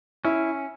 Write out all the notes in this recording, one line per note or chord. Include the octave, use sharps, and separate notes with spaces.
C#4 E4